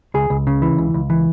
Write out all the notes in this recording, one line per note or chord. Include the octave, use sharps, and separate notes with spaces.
C#2 G#4
C#2
C#3
E3
C#2
C#2
E3